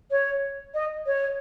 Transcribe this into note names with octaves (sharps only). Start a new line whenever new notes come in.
C#5
D#5
C#5